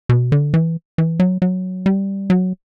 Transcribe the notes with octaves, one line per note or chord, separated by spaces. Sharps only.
B2
D3
E3
E3
F#3
F#3
G3
F#3